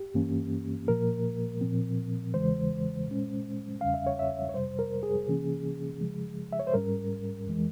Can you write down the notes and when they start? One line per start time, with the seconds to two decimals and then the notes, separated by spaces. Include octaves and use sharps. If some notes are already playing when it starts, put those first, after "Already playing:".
Already playing: G4
0.14 G2 E3 A#3 C#4
0.88 A#2 F3 A#3 A#4
1.61 A#2 F3 C4
2.34 E2 C#3 E3 G#3 C5
3.07 A#2 G#3 C#4
3.81 E2 C#3 G3 C#4 F5
3.94 E5
4.07 C#5
4.19 E5
4.49 C#5
4.54 F2 C3 G3 C5
4.79 A#4
5.03 G#4
5.28 C3 E3 A#3 C#4
6.00 C#3 F3 G#3
6.53 E5
6.59 C#5
6.67 C5
6.74 G#2 G3 C#4 A#4
7.46 F2 E3 G#3